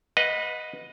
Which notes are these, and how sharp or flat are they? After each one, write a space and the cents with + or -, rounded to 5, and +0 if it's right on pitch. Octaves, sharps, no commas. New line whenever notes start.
B4 +0 D#5 +0 F#5 -40